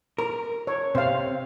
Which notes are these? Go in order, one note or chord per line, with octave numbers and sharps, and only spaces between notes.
A#4
C#5
C3 C5 F5